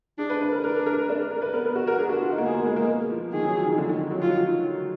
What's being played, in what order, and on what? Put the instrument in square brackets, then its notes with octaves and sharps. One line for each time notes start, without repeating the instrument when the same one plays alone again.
[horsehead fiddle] D4 [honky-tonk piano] G#4
[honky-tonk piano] B4
B4
A#4
[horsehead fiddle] D4 [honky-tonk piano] A#4
[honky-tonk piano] A#4
D4
A#4
A#4
B4
[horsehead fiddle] B3 [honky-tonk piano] A#4
[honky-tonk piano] A#4
F#4
A#4
[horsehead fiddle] D4 [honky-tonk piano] G#4
[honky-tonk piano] F#4
F4
D#4
A#3
[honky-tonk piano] B3 [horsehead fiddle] G#4
[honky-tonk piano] A#3
G#3
A#3
F3
[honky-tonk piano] D#3 [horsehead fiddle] G#4
[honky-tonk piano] F#3
F3
D#3
D3
D#3
F3
F#3
[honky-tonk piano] F#3 [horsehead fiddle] F4